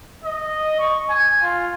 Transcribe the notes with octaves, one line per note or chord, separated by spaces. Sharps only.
D#5
C#6
G#5
F4